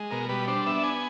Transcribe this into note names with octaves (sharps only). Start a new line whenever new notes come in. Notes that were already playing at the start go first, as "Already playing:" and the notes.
Already playing: G#3
B2 A#4
G3 B4
D4 C5
B3 E5
G#5